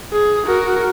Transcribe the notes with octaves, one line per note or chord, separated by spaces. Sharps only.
G#4
F#4 A#4